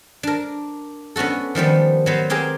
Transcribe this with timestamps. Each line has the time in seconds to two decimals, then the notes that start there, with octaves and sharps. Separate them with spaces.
0.23 D4 A#4
1.16 B3 C#4 D4 F#4 A4
1.55 D#3 F3 G3 B3
2.06 F#3 B3 C5
2.30 C4 G4 G#4 A#4 G#5